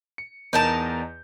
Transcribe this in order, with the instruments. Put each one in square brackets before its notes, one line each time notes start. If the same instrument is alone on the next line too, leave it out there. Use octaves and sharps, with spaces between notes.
[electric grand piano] C#7
[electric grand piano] E2 D#5 G6 [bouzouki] D#4 A#4 A5